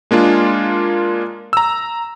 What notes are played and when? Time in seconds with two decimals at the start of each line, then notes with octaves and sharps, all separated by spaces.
0.11 G#3 A#3 D4 F4
1.53 A#5 E6